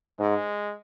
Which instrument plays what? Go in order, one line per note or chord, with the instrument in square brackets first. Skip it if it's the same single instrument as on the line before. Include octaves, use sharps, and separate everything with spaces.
[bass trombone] G#2 [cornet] G#3